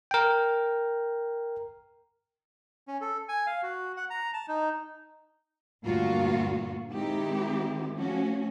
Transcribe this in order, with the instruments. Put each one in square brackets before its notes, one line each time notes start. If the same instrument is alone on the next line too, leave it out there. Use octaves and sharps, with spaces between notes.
[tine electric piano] A#4 G5
[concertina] C#4
A4
G#5
F5
F#4
F#5
A#5
A5
D#4
[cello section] D2 G2 A#2 F4 F#4 F5
D#3 G#3 C4 D#4 E4 G4
F3 A3 C#4 F#4